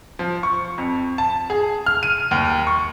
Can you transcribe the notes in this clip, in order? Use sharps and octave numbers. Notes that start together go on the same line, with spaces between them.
F3
C#6
F2
A5
G#4
F6
D#7
D#2
C#6